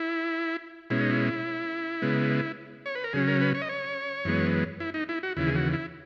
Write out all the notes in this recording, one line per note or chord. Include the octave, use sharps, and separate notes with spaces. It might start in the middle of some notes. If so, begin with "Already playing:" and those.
Already playing: E4
B2 G#3 C#4 E4
D#4
E4
C#3 G#3 B3
C#5
B4
A#4
C#3 F#3 C#4 G#4
A#4
B4
C#5
D#5
C#5
F#2 E3 G#3 B3
E4
D#4
E4
F#4
D#2 C#3 E3 E4
G#4
F#4
E4